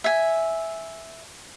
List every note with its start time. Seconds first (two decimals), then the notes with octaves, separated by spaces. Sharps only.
0.04 E5 G#5